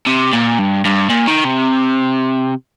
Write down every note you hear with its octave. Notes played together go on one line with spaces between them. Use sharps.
C3
A#2
G2
G2
A#2
D#3
C3